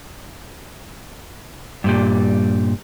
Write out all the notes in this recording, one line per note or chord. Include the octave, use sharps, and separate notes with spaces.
G2 A#2 G3